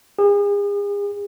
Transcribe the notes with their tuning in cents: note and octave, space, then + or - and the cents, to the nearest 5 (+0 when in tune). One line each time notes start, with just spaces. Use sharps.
G#4 -40